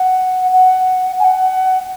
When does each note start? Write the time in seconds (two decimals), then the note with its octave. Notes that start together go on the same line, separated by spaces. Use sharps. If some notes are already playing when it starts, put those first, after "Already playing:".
Already playing: F#5
0.53 F#5
1.20 G#5
1.24 F#5